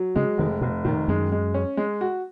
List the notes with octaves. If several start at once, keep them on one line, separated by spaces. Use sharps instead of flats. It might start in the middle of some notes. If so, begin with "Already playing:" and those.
Already playing: F#3
C#3 G#3
F1 D#3
F1 B2
A#2 D#3
F#2 G#3
G#3
C#4
G#3
F#4